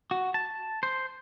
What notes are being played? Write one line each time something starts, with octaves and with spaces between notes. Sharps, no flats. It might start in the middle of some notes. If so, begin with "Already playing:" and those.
F#4
A5
C5